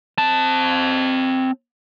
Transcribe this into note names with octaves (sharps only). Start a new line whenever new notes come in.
C4 A5